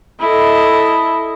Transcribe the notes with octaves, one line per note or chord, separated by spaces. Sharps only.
E4 A4 D#5